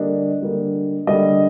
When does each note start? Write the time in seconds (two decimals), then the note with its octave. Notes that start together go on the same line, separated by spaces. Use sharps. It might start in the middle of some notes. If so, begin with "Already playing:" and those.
Already playing: D3 G3 A#3 D4 D#5
0.42 D3 G3 A#3 D4
1.07 D3 G3 A#3 D4 D#5